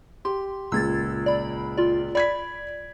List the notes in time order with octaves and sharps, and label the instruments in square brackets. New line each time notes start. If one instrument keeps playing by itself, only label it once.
[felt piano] G4 [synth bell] C6
[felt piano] C#2 A#2 [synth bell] E6 G#6 A6
[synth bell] D5 B5
F4 D5
[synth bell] D5 [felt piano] B5 G#6 B6